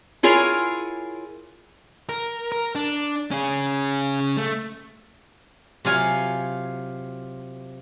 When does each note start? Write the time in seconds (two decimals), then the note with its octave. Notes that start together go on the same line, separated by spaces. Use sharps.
0.23 E4 F4 G#4 A#4 C#5
2.09 A#4
2.52 A#4
2.75 D4
3.31 C#4 G#4
4.37 A3
5.85 C3 F#3 F4 F5 G#5